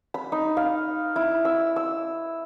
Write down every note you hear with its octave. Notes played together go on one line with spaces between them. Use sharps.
B5
D#4
F5
E4
E6
E6